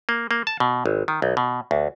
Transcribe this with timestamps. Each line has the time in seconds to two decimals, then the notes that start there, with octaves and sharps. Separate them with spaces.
0.09 A#3
0.31 A#3
0.47 A5
0.60 B2
0.86 G#1
1.08 D#3
1.22 B1
1.37 B2
1.71 D2